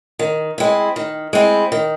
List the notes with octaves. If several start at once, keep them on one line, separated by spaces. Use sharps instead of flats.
D#3
G#3 C4 E4
D#3
G#3 C4 E4
D#3